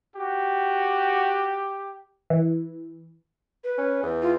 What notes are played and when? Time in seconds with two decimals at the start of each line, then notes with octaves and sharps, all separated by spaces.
0.16 F#4 G4
2.30 E3
3.64 B4
3.78 C#4
4.03 E2
4.22 F4